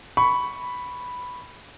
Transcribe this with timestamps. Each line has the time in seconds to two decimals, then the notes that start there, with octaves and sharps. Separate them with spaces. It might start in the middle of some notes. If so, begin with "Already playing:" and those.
0.17 B5 C#6